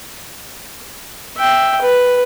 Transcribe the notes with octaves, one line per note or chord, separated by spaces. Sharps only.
E5 G5
B4